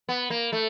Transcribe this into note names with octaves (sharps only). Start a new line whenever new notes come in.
B3
A#3
A3